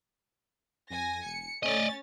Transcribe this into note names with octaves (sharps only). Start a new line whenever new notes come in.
F2 G#5 A#6
E1 C#7
A3 C#4 D5 D#5 A6